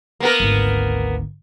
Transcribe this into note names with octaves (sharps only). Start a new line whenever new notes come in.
A#3 B3 A#4
G#1 D2